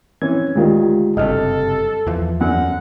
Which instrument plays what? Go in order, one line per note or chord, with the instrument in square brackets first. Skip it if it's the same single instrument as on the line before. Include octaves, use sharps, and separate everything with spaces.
[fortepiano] E3 C4 C#4 [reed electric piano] G#6
[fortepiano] D2 D#3 [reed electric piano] G#3 F4 G4
[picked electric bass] F#1 G2 C3 [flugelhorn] A4 [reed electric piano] D#5 F6
[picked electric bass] E2 E3 F3
[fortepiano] F#2 D3 [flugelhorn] F#5